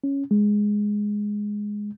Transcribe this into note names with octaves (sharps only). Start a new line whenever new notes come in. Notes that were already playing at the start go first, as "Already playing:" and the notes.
C#4
G#3